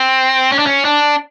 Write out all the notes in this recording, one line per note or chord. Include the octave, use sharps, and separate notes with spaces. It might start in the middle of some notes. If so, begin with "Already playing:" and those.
Already playing: C4
C#4
D4
C#4
D4